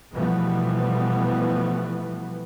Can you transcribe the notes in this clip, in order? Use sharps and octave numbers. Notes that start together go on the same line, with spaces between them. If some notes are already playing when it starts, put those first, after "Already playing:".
B2 E3 F3 G3 A3 B3